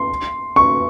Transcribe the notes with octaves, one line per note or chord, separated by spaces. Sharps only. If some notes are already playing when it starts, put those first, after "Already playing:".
Already playing: C6
C#6